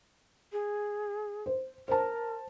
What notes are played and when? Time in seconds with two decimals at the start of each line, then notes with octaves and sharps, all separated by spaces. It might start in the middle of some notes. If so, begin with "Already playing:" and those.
0.52 G#4
1.46 C5
1.88 A#4 C5 A5